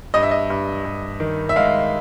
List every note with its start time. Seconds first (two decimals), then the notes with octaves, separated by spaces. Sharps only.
0.14 G2 D#5
0.23 E5
0.31 D#5
0.50 G2
0.85 G2
1.20 D#3
1.49 E5
1.56 G#3 F5